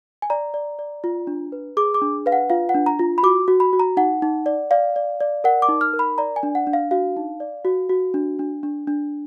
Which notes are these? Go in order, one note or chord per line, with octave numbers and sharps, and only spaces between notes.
G#5
D5 A#5
D5
D5
F4
D4
B4
G#4 D6
D6
D4
B4 F5
F#5
F4 F5
F#5
D4
A#5
F4
B5
F#4 D6
F#4
B5
F#4
A#5
D#4 F#5
D#4
D5
D5 F5
D5
D5
A#4 F#5
D6
D#4
F6
A#4
B5
D5 A#5
G#5
D4
F#5
D4
F5
F#4 F5
D#4
D5
F#4
F#4
D4
D4
D4
D4